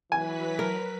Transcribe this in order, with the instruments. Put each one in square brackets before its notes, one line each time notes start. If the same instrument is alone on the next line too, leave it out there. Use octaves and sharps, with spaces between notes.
[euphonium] E3 [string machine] F#3 B4 B6 [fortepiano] G#5
[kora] A#4